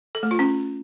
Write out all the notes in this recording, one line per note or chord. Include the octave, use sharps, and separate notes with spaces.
A4
A3
F4
C#4